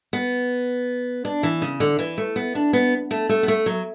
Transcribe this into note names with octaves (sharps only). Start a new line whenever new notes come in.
B3
D4
E3
C#3
D3
E3
A3
B3
D4
B3
A3
A3
B3
A3
F#3